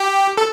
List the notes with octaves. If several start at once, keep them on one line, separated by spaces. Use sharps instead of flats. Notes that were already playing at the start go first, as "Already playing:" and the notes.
Already playing: G4
A4